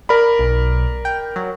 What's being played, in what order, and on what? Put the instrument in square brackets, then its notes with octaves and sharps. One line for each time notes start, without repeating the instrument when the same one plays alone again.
[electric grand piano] A#4 D5 B5
[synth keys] B1
G5
F#3